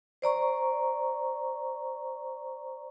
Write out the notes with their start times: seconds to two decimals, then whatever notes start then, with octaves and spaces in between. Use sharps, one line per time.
0.22 C5 D5 A#5 C#6